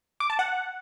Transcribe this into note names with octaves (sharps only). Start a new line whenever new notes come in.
D6
A5
F#5